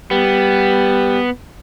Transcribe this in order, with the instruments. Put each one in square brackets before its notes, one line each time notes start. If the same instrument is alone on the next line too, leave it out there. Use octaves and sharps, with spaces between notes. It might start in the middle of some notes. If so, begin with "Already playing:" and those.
[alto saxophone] G3 [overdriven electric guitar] B3